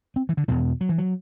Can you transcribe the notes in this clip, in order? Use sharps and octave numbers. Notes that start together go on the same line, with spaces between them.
C4
E3
D3
E2 B2 E3
F#3
E3
F#3